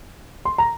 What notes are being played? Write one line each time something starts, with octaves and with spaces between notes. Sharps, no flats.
C6
A#5